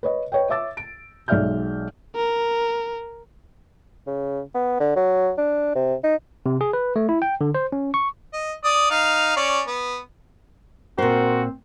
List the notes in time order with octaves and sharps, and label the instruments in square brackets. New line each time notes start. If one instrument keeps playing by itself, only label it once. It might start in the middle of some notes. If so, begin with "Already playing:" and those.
[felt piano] B4 C#5 D#5
B4 C#5 D#5 G5
C#5 E5 D6 E6 A6
D7
B1 G#3 D5 E5 F6 G6
[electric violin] A#4
[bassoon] C#3
B3
D3
F#3
D4
C3
D#4
[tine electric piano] C3
G#4
B4
A3
E4
G5
D3
C5
C#4
C#6
[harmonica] D#5
D5 D#6
D#4 F5
C#4 D5
B3
[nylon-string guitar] A#2 C5 [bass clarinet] C4 [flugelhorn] F#4 [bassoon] A#4